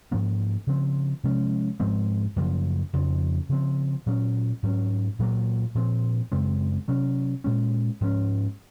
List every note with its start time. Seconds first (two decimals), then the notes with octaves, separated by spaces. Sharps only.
0.11 G#2 F3 A#3 C#4
0.67 C#3 F3 C4
1.24 C3 F3 G#3 C#4
1.80 G#2 F3 G#3 C4
2.36 F#2 C#3 F3 A#3
2.93 F2 C#3 F3
3.49 C#3 F3 C4
4.06 A#2 F#3 C#4
4.63 G#2 F#3 C#4
5.19 A#2 F#3 A#3
5.75 A#2 F3 C4
6.32 F#2 C#3 G#3 C4
6.88 C3 F#3 C#4
7.44 A#2 G#3 C#4
8.01 G#2 F3 A#3 C#4